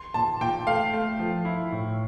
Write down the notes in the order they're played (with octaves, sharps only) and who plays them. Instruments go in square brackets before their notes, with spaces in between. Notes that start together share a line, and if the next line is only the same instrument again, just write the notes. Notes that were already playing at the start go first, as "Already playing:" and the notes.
Already playing: [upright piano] C6
[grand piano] A#2 [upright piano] A5
[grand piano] A#2 [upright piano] G5
[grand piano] A3 [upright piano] F5
[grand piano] A3
F3
E4
A2